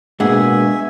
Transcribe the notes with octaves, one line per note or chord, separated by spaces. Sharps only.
B2 G#3 A#3 D4 G#4 E5 F#5 G#5